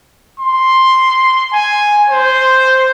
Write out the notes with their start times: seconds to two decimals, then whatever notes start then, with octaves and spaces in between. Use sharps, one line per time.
0.39 C6
1.53 G#5
2.10 C5